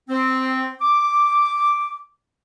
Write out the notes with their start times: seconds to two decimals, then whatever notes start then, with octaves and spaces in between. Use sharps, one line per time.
0.08 C4
0.81 D6